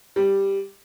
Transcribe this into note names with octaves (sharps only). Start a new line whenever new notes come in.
G3